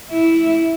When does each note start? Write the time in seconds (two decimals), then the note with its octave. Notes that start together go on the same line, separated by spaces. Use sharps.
0.10 E4